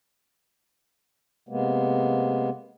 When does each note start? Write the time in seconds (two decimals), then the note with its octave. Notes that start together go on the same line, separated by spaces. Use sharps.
1.49 C3 G#3 A#3 B3